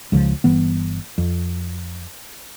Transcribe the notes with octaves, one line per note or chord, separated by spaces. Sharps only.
C#2 C#3 E3 F3
G1 E3 B3
F2